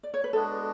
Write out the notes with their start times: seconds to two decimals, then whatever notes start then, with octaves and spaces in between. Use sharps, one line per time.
0.03 D5
0.14 C#5
0.24 B4
0.33 G#3 B3 D4 F#4 A4